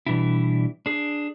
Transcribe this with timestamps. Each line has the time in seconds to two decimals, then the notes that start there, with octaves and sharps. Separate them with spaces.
0.06 B2 E3 G3 D4 E4
0.86 D4 G#4